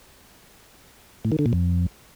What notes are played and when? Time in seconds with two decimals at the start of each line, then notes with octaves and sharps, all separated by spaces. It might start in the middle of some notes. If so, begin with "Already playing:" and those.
1.25 A2
1.32 D#3
1.39 D3
1.46 A#2
1.53 F2